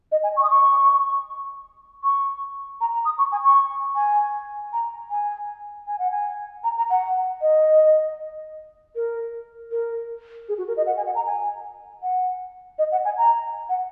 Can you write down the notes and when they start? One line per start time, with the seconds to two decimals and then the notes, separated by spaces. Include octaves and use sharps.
0.12 D#5
0.23 G#5
0.37 C#6
0.43 D#6
0.50 C#6
2.03 C#6
2.81 A#5
2.94 A#5
3.05 D#6
3.18 C#6
3.32 G#5
3.44 C#6
3.95 G#5
4.73 A#5
5.11 G#5
5.87 G#5
5.99 F#5
6.11 G#5
6.64 A#5
6.78 A#5
6.90 F#5
7.42 D#5
8.96 A#4
9.71 A#4
10.49 G#4
10.58 F#4
10.68 A#4
10.77 D#5
10.86 F#5
10.97 G#5
11.06 F#5
11.15 A#5
11.26 G#5
12.02 F#5
12.79 D#5
12.92 F#5
13.05 G#5
13.18 A#5
13.69 F#5